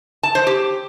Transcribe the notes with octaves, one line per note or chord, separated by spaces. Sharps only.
A5
C5
G4